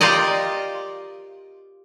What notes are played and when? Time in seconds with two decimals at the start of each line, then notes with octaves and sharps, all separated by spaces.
0.01 F4 G4 A#4 D5 D#5